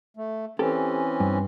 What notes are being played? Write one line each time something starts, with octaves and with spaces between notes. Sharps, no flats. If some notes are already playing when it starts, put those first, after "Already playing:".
A3
E3 C4 C#4 G4 A4
G2